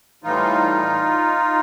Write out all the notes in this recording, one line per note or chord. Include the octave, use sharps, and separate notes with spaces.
A2 E3 G3 D#4 F4